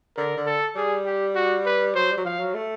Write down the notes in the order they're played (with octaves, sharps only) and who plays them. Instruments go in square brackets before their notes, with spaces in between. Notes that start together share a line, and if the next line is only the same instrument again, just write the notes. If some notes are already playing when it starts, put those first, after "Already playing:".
[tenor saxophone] D3 [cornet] A#4
[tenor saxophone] D3
[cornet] A4
[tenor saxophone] G3 [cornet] G#4
[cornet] G4
F#4
B4
[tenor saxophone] F#3 [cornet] C5
[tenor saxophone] G3
F#3
[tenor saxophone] F3 [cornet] F5
[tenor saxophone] F#3
A3